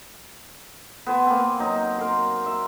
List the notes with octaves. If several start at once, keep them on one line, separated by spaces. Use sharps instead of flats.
B3 C5 G#5
A#3 C4
F#3 D#4
A#4 C6
E5